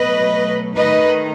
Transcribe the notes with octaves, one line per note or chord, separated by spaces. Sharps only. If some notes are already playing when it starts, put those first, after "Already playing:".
Already playing: B2 F#3 A3 B4 D#5
D#3 A3 D#4 B4 D#5